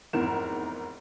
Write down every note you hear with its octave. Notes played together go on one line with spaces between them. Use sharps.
F1 E2 G#2 E4 A#4 E7